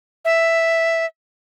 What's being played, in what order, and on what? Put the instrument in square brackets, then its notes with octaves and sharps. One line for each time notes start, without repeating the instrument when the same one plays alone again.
[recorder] E5